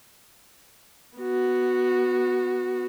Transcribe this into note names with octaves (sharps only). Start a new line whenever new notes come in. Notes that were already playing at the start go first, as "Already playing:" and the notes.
B3 F#4